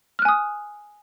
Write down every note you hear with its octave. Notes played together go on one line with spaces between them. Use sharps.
G#5 D#6 F6 F#6